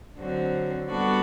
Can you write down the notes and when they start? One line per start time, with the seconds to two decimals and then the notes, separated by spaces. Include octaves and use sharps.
0.16 D3 F#3 C4 F#4
0.88 G3 B3 D4 F#4 A4